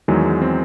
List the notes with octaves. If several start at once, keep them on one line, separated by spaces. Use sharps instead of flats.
E2 D#3 F#3 G#3
G#3
C4